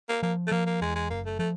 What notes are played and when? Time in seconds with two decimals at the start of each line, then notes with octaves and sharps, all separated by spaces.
0.09 A#3
0.23 F3 A#3
0.47 A3
0.52 F3 A#3
0.66 A#3
0.81 E2 G#3
0.95 G#3
1.10 F#1 A#3
1.25 A3
1.39 F3 A3